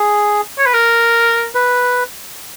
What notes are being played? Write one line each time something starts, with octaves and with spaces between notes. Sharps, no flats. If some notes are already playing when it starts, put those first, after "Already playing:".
Already playing: G#4
C#5
B4
A#4
B4